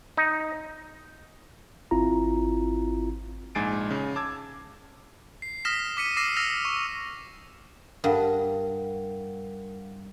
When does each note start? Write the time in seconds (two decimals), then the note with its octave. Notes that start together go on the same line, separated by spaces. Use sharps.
0.17 D#4
1.91 G#1 C4 E4 F4 A#5
3.55 A#1 G#2 G#5 A6 C7 D7
3.90 C#3
4.16 A5 D6 E6 G#6
5.42 C7
5.65 D#6 F6 A#6 B6 E7
5.97 D6 B6 C#7 D#7
6.17 D6 E6 A#6 C7 C#7 E7
6.36 E6 F6 A#6 F7
6.65 C#6
8.04 G2 A#4 F5 F#5